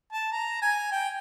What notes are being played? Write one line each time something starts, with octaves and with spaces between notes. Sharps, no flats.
A5
A#5
G#5
G5